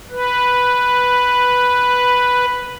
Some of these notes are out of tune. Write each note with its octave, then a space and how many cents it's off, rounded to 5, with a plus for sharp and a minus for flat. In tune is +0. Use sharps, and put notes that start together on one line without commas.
B4 +0